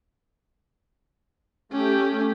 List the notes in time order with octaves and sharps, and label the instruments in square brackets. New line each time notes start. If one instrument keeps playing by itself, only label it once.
[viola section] A3 G4 [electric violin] C#4